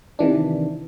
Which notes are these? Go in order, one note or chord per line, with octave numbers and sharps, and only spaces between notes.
C3 D#3 E3 D4